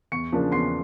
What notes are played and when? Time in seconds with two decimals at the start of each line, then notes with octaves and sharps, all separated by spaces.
0.12 E2 C#6 C#7
0.32 C#3 F3 A#3 D4
0.52 E2 C6 C7